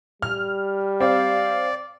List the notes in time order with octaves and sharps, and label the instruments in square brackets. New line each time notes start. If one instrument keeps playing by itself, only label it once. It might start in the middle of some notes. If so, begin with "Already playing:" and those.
[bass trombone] G3 [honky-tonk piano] F6
[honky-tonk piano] C4 [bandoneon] D5 [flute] F5